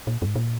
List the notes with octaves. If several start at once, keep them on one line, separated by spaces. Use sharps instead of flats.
A#2
F#2
G#2
A#2